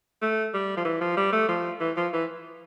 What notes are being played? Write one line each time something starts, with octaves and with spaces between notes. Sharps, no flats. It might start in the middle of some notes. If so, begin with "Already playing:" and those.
A3
G3
F3
E3
F3
G3
A3
F3
E3
F3
E3